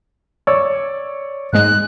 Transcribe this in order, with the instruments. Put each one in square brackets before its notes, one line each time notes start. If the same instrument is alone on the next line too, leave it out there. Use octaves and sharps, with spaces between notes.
[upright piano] C#5 D5 E6
[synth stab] G#2 G#3 [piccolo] F#6